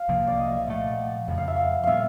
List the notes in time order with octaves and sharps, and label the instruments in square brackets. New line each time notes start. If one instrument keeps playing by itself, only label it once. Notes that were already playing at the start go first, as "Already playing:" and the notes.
Already playing: [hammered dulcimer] F5
[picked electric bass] C2 C3 F3 A#3
[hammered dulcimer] D5
D#5
E5
F5
[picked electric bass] A#2 F3 A3 [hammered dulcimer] F#5
[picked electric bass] F2 C#3 F3 [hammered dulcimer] F#5
[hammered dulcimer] F5
E5
F5
[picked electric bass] A#2 G3 B3 [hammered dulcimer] E5 F5